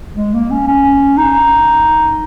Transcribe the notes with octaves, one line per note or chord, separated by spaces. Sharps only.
G#3
A#3
C#4
C#4
D#4